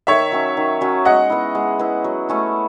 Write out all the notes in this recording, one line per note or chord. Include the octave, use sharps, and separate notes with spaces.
D#3 C#5 E5
F#3 C#4
D#3
F#3 C#4
G#3 D#5 F#5
B3 E4
G#3
B3 E4
F#3
A3 C#4 E4